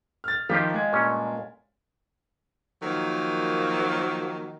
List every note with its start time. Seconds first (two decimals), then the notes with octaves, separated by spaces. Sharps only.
0.24 F6 A6
0.49 D#3 F3 F4 G4 A#5 B6
0.74 G#3 G#6
0.93 G2 A#2 C#4
2.82 D#3 F3 F#3 A#3